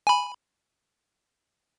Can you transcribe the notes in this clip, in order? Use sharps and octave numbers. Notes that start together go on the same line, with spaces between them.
G#5 B5